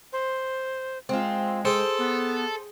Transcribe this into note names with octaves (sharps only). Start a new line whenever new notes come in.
C5
G#3 C4 F4
G#4 A4 C5 G5
B3